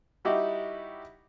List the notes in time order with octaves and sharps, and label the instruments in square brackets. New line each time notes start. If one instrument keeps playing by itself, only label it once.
[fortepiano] G3 D#4 E4 F#4 G4